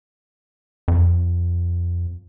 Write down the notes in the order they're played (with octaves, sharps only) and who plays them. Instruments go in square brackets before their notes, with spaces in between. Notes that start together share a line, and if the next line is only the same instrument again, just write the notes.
[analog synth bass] F2